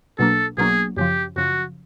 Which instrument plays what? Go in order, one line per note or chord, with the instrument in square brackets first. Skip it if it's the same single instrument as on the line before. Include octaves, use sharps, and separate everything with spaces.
[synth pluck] B1 B2 F#3 A#3 D4 [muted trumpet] A4
[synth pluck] B1 B2 F#3 A#3 D4 [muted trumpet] G#4
[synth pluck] F#2 C#3 F3 [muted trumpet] G4
[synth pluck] F#2 C#3 F3 [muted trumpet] F#4